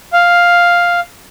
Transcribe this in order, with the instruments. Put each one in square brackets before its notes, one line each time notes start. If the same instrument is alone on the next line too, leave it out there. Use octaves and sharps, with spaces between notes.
[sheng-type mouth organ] F5